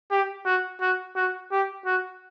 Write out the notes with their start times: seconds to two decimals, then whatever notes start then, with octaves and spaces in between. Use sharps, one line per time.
0.11 G4
0.45 F#4
0.81 F#4
1.16 F#4
1.51 G4
1.86 F#4